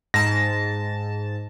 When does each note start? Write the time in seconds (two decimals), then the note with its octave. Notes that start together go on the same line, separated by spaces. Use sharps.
0.14 G#2 A5 A#6